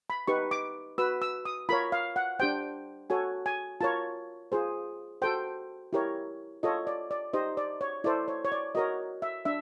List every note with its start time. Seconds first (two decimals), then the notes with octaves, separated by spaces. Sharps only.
0.10 B5
0.27 D#4 G4 B4 C#6
0.51 D6
0.98 F#4 B4 E6
1.22 E6
1.45 D#6
1.69 F4 A#4 C#5 B5
1.92 F5
2.16 F#5
2.39 D4 G4 C5 G5
3.10 F#4 A4 C#5 G#5
3.46 G#5
3.81 F4 A#4 C#5 A5
4.52 F4 G#4 C5
5.22 F#4 A4 C5 G5
5.93 E4 G4 A#4 C#5
6.63 F4 A4 C#5 D#5
6.87 D5
7.11 D5
7.33 D#4 G4 C5 D#5
7.57 D5
7.81 C#5
8.04 E4 A4 C5 D5
8.28 C#5
8.45 C#5
8.52 D5
8.75 F#4 A#4 C#5 D#5
9.22 E5
9.45 D4 E5